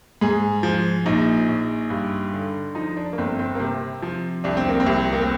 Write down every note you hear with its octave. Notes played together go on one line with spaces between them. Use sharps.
G#2 G#4
F3
A#1 D#4
A#1
G2
D3
F3 D#4
D4
A#3
G1 C4
C4
A#3
C3 C4
F3
C2 D4
C4
A#3
C4
C2
A#3
C4